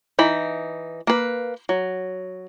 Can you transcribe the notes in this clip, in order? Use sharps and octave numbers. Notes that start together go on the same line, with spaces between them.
E3 D#4 B5
A#3 B4
F#3